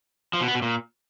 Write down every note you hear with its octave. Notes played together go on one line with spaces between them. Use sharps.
F3
B2
B3
B2
A#2